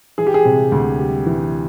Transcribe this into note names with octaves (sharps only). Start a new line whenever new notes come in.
E3 G#4
G4
G#4
C3
D2
G3
E3